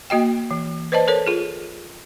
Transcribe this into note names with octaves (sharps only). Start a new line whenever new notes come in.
A#3 F#4 D#5 G5
E3
B4 C5 D5 D#5 A5
A4 A#4 C#5
F4 G#4